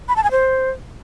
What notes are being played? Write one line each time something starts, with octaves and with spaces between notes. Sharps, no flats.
B5
A5
G#5
C5